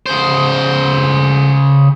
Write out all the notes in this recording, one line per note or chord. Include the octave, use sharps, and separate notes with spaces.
C#3 C5